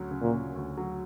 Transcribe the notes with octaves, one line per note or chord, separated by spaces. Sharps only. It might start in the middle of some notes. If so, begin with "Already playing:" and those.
Already playing: D2 F#3 C#4
C#3
A#2
C#4
D2
F#3